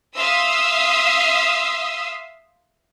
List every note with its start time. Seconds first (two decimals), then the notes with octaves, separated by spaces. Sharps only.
0.15 E5 F5 C6 D#6 E6